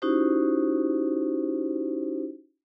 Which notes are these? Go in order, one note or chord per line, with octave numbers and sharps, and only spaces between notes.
C#4 D#4 E4 F#4 G4 C5